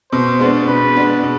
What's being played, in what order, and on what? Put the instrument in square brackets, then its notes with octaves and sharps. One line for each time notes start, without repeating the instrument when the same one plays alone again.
[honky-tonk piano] B2 [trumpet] C5
[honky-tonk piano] G#3 B3 D4
[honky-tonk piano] B2 [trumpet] B4
[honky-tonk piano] G#3 B3 D4
B2